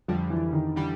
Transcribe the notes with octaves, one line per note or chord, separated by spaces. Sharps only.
F2 D3 F3 G3
E3
D#3
D3 E3 G3